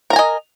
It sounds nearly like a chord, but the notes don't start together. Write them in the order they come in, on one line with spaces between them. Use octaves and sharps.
A#4 A#5 G#5 D#5